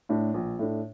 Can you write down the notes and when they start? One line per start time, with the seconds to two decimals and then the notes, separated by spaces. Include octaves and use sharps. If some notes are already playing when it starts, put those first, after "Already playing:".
0.09 A2 A3 D4
0.34 A#1
0.59 A2 A3 D4